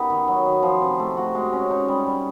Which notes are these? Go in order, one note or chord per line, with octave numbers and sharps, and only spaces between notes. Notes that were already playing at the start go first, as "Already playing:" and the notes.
Already playing: B3 D#4 G4 A#4
D#3
F#3
D#3
F3
C3
A3
F#4
G#3
C#4
D#4
G3
G3